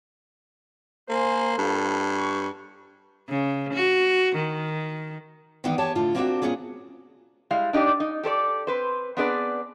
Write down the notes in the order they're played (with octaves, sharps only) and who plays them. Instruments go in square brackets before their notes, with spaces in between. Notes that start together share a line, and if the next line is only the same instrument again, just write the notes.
[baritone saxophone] A#3 [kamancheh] C5 G#5
[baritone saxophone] G2 [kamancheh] F4 A4
[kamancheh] C#6
[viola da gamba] C#3
F#4
D#3
[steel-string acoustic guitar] D#3 E3 G3 B3 D#4 G4
E2 G4 C#5 G#5 A5
A2 D3 F4
A#3 C4 D4 D#4 F#4 G4
A#2 B3 C#4 F4 G#4
[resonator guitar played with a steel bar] G3 G#3 E4 F5
D4 D#4 G4 D5
D#4
G4 A4 C5 D5
C4 B4 C5
B3 C4 D4 G#4 B4 D5